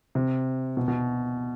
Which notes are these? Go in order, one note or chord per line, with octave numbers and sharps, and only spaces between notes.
C3
B2
B2